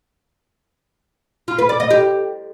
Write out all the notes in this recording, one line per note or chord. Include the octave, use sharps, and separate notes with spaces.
F4
B4
D5
D#5
G4